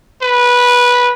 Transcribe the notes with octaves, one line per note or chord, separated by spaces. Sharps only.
B4